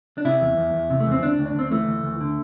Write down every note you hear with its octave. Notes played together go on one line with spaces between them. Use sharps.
D4
C3 E4
E2
E2
E2
C3
A3
E2
C4
D2 D4
D2
D4
D2 C4
E3 A3
D2
D2
D3